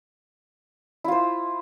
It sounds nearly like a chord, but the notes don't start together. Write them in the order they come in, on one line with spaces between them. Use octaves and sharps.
E4 F4 C5